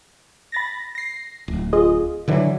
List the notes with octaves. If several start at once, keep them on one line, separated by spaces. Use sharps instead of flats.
B5 A6 A#6
A#6 C7
D1
F4 G#4 D#5
D3 E3 F#3